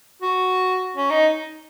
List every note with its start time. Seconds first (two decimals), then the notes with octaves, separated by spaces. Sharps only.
0.22 F#4
0.96 C#4
1.11 D#4